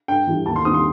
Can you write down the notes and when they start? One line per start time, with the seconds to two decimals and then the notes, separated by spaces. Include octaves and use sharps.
0.08 G2 G5
0.27 E3 G3
0.46 D#2 A5
0.56 C6
0.65 D#3 G3 C4 D#6
0.74 C6